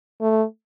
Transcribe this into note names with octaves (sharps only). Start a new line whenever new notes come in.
A3